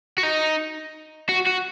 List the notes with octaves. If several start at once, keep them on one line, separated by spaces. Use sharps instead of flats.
F#4
D#4
F#4
F#4